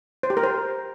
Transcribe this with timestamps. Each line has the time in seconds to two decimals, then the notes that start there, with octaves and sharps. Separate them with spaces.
0.23 C5
0.30 G4
0.37 A#4
0.44 C5